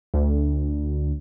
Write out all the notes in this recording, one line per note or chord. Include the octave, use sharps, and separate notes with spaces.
D2